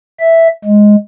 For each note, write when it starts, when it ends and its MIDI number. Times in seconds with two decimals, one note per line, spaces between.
0.20 0.48 76
0.65 0.96 56